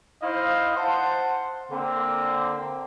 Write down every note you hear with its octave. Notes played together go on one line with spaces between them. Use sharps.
D#4 E4 C5 D#5 F5
C5 F#5 A5
D3 A#3 C4